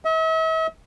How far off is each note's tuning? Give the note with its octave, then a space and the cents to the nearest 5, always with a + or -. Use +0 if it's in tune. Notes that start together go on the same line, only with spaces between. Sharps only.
E5 -45